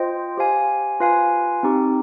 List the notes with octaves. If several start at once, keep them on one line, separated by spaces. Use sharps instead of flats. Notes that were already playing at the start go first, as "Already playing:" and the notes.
Already playing: F4 C5 D#5 G5
G4 C5 F5 G#5
F4 B4 F5 G#5
C4 D#4 G4